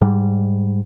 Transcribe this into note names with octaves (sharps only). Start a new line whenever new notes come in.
G#2 G3